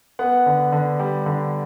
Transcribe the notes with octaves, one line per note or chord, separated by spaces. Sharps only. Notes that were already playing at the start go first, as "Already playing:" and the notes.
B3 F#5
D3
D3
G3
D3